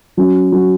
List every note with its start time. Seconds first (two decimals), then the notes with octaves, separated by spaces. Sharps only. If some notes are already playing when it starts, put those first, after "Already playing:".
0.17 F#3 C#4 F#4
0.52 F#3 C#4 F#4